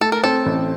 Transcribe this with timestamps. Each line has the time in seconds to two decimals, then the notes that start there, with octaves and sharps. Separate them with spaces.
0.01 A3 A4
0.12 A#4
0.23 C4 A4
0.46 A1